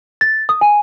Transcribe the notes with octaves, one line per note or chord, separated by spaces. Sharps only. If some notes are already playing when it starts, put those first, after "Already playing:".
A6
D#6
G#5